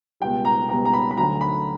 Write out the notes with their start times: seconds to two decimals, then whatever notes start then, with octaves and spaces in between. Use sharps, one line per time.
0.20 C#2 B2 G3 G5
0.45 A#5
0.69 C#2 B2 G3 A#5
0.85 A#5
0.93 B5
1.11 B5
1.17 D2 D3 F#3 A#5
1.41 B5